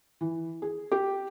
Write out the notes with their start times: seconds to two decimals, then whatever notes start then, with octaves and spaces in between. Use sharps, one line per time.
0.21 E3
0.62 G#4
0.92 G4